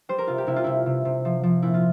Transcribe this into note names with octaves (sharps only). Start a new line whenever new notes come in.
G3 C5
A#4
C3 F4
G4
C3 E4
F4
C3 E4
C3
C3
F3
F3
A#2 E4
F4